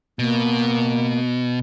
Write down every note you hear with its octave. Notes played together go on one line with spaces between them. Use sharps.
B2 A#3